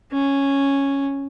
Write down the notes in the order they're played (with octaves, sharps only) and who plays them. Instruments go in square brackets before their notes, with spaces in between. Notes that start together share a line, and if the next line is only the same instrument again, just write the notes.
[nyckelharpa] C#4